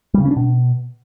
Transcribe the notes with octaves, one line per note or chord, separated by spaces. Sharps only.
G3
C#3
C#4
D4
B2